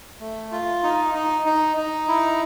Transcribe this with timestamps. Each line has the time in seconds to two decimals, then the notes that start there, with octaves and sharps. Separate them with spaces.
0.20 A3
0.52 F4
0.83 D#4
1.14 D#4
1.46 D#4
1.77 D#4
2.08 E4